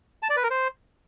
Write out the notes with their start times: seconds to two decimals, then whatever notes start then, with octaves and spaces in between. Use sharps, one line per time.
0.23 A5
0.30 D5
0.37 B4
0.44 A#4
0.51 C5